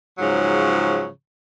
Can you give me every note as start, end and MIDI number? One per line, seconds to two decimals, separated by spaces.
0.18 1.06 44
0.18 1.06 49
0.18 1.06 53
0.18 1.06 54